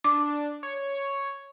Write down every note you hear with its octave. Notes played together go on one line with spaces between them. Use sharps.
D4 D6
C#5